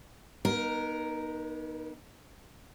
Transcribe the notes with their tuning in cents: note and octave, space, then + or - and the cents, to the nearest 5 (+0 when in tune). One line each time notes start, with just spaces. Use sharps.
B3 -35 D#4 -5 A#4 +0